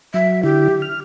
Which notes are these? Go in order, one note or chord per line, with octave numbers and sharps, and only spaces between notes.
F#3 E5
D3 E4 G4
F6